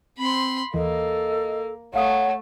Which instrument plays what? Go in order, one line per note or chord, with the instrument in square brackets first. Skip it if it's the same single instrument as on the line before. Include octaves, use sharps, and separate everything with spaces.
[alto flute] C4 [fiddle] B5 C6
[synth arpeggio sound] D#2 E3 [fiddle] A#3 [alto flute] A4 [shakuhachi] D#5
[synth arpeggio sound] G#1 F5 D#6 [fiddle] A3 [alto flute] C#5 [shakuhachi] F#5